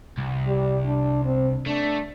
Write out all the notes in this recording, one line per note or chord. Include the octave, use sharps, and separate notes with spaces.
C2
G3
D4
C4
A3 D4